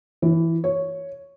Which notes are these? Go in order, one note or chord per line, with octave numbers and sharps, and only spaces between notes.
E3
C#5